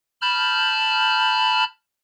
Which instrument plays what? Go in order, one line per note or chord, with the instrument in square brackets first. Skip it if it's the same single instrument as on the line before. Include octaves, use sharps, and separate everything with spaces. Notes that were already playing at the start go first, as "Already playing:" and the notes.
[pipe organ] A5 B5 F6 G6